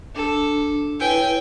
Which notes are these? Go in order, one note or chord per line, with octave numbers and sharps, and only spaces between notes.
D4 A4
E4 B4 C#5 G5 G#5